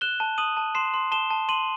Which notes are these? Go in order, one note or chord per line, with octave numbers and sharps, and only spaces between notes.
F#6 E7 G7
A5
D#6 D#7 F#7
A5
C6 C7 E7
C6
A5 E7 G7
A5
C6 D#7 F#7